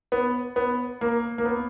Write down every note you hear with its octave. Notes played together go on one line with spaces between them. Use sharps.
B3
B3
A#3
A#3
B3